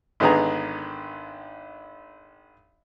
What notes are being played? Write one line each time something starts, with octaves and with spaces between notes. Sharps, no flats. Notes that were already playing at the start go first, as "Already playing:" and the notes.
G#1 D3 D#3 B3 G#4 A#5